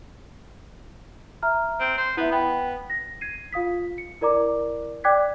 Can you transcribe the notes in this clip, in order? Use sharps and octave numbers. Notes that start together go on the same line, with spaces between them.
E5 A#5 F6
C4
C5
B3 E4 E5
B3 G5 B5
A#6
G#6 C7 D#7
F4 F5 D#6 B6
C#7
E4 A#4 D5 A#5 D6
D5 G5 D6 F#6 G#6 B6